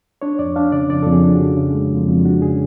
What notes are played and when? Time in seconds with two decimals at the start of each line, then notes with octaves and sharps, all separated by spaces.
0.22 D4 C#5
0.39 F2 D5
0.56 D4 F5
0.72 C#3 D5
0.90 F2 D5
1.03 F2 A4
1.12 G#4
1.24 D4
1.34 F#4
1.41 C#3
1.58 C#3
1.74 G#3
1.91 F2
2.08 F2
2.25 D4 F#4
2.42 C#3 G#4